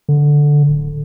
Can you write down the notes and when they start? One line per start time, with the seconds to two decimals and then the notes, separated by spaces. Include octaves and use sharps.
0.09 D3
0.69 D1